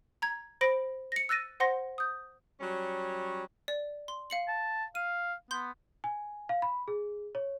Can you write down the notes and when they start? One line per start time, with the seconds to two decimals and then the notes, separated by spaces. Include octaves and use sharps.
0.22 A#5 G#6
0.61 C5 B5 A#6 D7
1.12 A#6 C#7
1.29 E6 F#6 A6 A#6 D#7
1.60 C5 F#5 C6 A#6
1.98 D#6 G6
2.60 F#3 G3 C#4 C#5
3.68 D5
4.08 C6
4.30 F5 C#7 F#7
4.48 A5
4.95 F5 D#7
5.51 B3 C6 G6
6.04 G#5
6.49 F5
6.62 B5
6.88 G#4
7.35 C#5